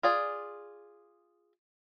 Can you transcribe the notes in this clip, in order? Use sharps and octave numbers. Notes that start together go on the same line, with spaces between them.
F4 G#4 D5